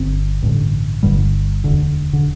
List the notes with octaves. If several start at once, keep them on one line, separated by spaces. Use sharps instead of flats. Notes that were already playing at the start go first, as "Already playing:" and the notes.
Already playing: G1 G2 D3 C4
A1 G2 D3
G1 G2 D3 G3
E1 D2 D3
D3